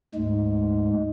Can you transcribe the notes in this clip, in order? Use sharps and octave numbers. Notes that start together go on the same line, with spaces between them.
D2 G#2 G#3